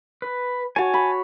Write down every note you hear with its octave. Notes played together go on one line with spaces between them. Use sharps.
B4
F#4 C#5 G#5 A5
B5